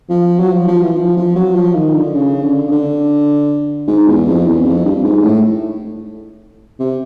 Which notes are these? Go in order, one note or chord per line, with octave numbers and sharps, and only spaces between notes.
F3
F#3
F3
F3
E3
F3
F3
F#3
F3
D#3
D3
C#3
D3
C#3
D3
G#2
E2
F2
E2
F2
G2
G#2
A2
C3